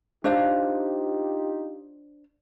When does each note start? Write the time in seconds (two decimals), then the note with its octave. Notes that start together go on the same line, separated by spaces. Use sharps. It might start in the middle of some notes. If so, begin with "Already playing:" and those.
0.24 D4 D#4 F4 G4 C5 F5